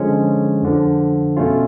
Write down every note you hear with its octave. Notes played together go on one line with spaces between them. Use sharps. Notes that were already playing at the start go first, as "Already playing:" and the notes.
Already playing: D3 F3 G#3 C#4
F2 D3 F3
B2 A3 C#4 F4